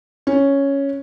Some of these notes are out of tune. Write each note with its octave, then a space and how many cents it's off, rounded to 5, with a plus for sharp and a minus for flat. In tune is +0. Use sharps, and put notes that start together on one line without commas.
C#4 +0